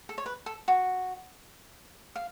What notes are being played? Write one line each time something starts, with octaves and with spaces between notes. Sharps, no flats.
A4
C#5
B4
A4
F#4
F5